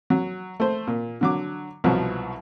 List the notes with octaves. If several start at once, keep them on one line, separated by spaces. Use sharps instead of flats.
F#3
A3 C5
A#2
D3 F#3 D6
C2 B2 F3 F#3